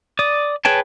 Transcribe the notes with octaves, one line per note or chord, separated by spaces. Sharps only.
D5 D#6
G#4 B4 C#5 G5 A5